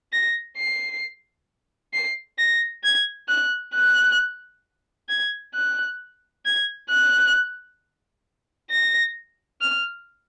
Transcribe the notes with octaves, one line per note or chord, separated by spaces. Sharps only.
A#6
C7
C7
A#6
G#6
F#6
F#6
G#6
F#6
G#6
F#6
A#6
F6